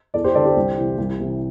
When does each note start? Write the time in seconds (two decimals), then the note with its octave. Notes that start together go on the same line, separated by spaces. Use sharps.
0.14 E2 A4 D5
0.24 G4 C5
0.35 D3 A4 D5
0.46 G4 C5
0.56 C2
0.77 C3 E3
0.98 C2
1.19 C3 E3